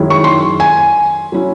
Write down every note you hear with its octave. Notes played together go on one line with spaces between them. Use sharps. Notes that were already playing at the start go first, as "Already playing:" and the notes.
Already playing: F#2 D#3 G#3 C#4 E4
C#6
C6
G#5
F#3 C#4 E4